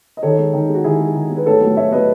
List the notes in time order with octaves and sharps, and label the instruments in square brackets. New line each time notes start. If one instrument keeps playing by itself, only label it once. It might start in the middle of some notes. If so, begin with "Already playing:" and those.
[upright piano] D#5
D#3 A4 C#5
G#3
D#3
G#3
F#4
D#3 E4 G#4
G#3
D#3
G#3
B4
A2 A4 C#5
F#3 A3
A2 C#5 E5
F#3 A3 B4 D#5